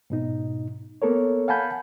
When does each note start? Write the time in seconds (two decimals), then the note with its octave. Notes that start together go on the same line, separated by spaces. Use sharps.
0.10 G#2 B2 D#4
1.02 A#3 B3 A4 A#4 C#5
1.48 F5 F#5 G#5 A5 B5 G6